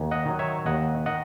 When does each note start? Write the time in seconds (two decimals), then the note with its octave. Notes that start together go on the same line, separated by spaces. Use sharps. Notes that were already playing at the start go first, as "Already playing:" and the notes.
Already playing: D#2
0.11 D#5 F#5
0.25 D#3 F#3
0.39 C#5 E5
0.66 D#2 D#5 F#5
1.06 D#3 D#5 F#5